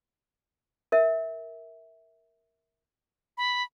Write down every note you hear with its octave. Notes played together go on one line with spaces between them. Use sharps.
A#4 E5
B5